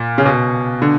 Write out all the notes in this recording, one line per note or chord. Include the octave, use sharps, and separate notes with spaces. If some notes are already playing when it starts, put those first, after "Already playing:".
Already playing: A#2
C#3
B2
D3